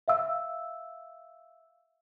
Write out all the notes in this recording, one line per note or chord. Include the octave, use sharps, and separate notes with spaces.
E5 F5 E6